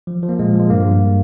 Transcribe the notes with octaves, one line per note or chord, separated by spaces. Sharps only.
F3
F3
A#3
A#2 G#3
F3
G#3
G2 A#3
G2